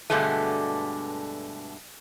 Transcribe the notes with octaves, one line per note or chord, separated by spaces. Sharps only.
G2 B2 D3 G#3 A3